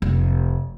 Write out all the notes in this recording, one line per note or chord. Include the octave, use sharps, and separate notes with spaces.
F1